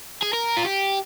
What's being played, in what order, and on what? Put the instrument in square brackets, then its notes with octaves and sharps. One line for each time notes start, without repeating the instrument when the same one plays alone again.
[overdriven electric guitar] G#4
A#4
F4
G4